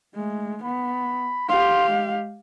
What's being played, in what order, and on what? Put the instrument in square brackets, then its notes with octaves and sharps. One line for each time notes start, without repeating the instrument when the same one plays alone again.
[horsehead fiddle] G#3 [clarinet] A3
[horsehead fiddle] B3 [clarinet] B5
[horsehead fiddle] G4 F5 [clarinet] C6
[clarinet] G#3